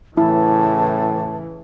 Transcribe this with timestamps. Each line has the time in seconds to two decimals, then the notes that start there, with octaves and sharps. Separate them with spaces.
0.17 A2 C#3 E3 E4 A5